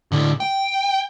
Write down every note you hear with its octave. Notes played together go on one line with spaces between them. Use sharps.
A2 D3
G5